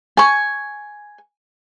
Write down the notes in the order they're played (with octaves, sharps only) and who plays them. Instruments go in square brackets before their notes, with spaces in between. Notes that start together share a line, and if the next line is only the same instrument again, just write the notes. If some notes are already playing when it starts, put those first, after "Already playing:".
[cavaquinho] G#5 C#6